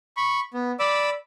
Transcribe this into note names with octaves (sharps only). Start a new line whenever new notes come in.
B5 C#6
B3
D5 B5 D6 E6